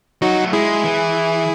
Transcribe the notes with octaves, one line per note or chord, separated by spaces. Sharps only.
F#3 D#4 F#4
A3
G#3 E4 G#4
E3